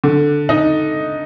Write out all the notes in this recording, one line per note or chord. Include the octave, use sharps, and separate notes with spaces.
D3
D#4